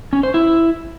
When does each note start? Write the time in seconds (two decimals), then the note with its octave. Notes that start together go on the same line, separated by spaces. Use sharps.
0.13 C#4
0.23 C5
0.34 E4